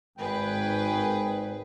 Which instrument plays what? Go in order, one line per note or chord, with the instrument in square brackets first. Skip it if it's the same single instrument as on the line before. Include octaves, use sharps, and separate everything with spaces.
[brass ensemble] G#1 [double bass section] G#2 [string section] G#4 B4 [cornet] G5